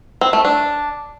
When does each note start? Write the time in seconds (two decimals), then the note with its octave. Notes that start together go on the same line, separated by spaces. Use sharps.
0.21 C4
0.33 A3
0.45 D4